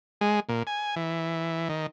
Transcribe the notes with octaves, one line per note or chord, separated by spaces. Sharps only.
G#3
A#2
G#5
E3
D#3